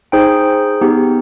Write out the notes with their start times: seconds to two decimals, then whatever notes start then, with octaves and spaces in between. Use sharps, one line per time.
0.12 D#4 G#4 C5 G5
0.81 B3 D#4 G4